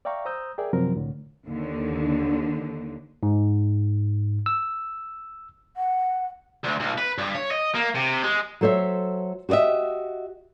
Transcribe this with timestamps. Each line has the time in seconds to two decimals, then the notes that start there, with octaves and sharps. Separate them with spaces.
0.05 D5 E5 F5 G5 A#5 C#6
0.25 C5 A#5 D#6 E6 G6
0.58 G#4 A#4 D5 E5 G5 G#5
0.73 F#2 C3 F3 F#3 C4 A#4
0.95 C2 A2 D3
1.47 D#2 D3
3.23 G#2
4.46 E6
5.77 F#5
6.64 D2
6.80 B1
6.98 B4
7.18 G2
7.35 C#5
7.51 D#5
7.75 A#3
7.95 C3
8.24 G#3
8.61 F#3 A4 C5 C#5 E5
9.49 F#4 G4 C5 D#5 E5